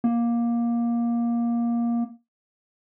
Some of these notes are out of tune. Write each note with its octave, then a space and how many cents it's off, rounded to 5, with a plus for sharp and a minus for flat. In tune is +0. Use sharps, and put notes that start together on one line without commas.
A#3 +15